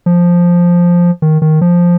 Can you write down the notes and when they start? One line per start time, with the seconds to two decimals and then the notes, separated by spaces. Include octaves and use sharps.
0.06 F3
1.22 D#3
1.42 D#3
1.61 F3